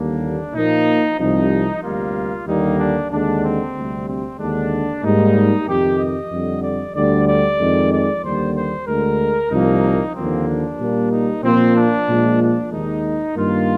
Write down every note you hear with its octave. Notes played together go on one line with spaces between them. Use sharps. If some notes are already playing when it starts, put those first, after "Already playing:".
Already playing: D#2 D3 G3 A#3 D4
A#2 F3 A#3 D#4
C2 C3 F3 D#4
D2 C3 G3 A#3 F4
D#2 D3 G3 A#3 D#4
D4
D#2 D3 G#3 D4
C4
D2 C3 G3
C4
D#2 D3 G#3 D4
G#2 G3 A#3 D#4
F2 C3 D#3 G4
D#5
F2 D3 G3
D5
D2 D3 G3 D5
D5
F2 D#3 G#3
D5
D#2 D3 G3 A#3 C5
C5
D2 D3 G#3 A#4
C2 A#2 F3 A#3 D#4
D#2 D3 F3 A#3 C4
D4
A#2 G3 A#3
D#4
A#2 F3 A#3 C4
D4
A#2 F3 G#3
D4
D#2 D#3 G#3 D#4
G2 D#3 A#3 F4